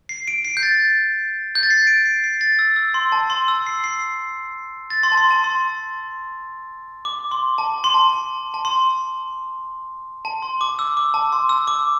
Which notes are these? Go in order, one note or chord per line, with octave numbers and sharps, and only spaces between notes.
C7
D7
C7
G6
A6
G6
A6
C7
D7
C7
C7
A6
E6
E6
C6
A5
C6
E6
C7
C7
A6
C6
A5
C6
A5
C6
D6
C6
A5
C6
A5
A5
A5
C6
A5
C6
D6
E6
D6
A5
C6
E6
D6